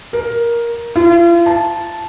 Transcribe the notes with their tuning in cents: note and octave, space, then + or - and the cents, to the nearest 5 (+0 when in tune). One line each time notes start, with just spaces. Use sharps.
A#4 +10
F4 -40
A5 -10